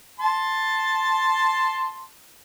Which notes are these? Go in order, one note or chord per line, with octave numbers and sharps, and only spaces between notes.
A5 C6